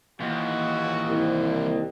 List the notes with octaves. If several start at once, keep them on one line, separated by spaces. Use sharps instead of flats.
D#2 E3 F4 F#4
C2